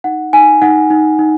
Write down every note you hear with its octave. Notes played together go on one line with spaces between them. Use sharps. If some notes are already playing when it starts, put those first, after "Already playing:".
D#4 F#5
D#4 G#5
D#4 F#5
D#4
D#4